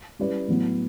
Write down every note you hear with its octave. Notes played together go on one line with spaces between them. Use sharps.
G3 C#4 E4 B4 D5
A2 F#3 B3